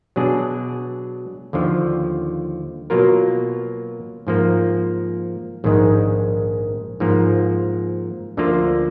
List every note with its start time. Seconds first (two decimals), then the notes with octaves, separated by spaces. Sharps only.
0.16 B2 F#3 D4 G#4
1.53 D#2 D3 F3
2.90 B2 F#3 A#3 F4 A#4
4.27 G#2 F3 A#3
5.64 A#1 G#2 D#3 G#3
7.00 G#2 F3 A#3
8.37 D2 D3 F3 A#3 F4